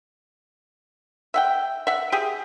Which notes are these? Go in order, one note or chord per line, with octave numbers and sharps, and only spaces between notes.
E5 F#5 G5
E5 F#5
G4 G#4